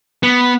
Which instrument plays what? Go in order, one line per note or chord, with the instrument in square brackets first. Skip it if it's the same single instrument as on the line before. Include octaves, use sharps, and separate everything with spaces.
[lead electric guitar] B3